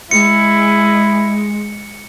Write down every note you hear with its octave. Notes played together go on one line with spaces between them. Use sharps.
G#3 E4 C#7